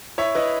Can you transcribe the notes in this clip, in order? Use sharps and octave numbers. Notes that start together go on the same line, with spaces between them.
E4 C#5 E5
E4 B4 D#5